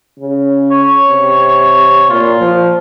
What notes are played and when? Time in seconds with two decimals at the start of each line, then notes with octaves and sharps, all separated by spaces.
0.19 C#3
0.71 C#5
1.09 C3
2.10 A#2 F4
2.40 F3